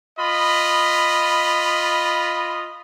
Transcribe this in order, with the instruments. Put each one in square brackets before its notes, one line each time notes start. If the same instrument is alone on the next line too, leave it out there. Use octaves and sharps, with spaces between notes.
[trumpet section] F4 D#5 B5